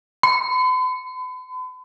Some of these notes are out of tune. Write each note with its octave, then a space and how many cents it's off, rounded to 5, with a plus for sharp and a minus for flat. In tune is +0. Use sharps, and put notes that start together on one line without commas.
B5 +45